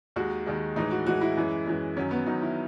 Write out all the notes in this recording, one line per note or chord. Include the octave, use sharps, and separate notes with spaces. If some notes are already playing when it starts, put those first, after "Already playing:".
D#2 D#3 G#3 F#4
D#2 D#3 G#3
A2 E3 G#3 D#4
F#4
A2 E3 G#3 F#4
E4
F#2 E3 G#3
F#2 E3 G#3
F#2 D#3 F#3 C#4
B3
F#2 D#3 F#3 D#4
E4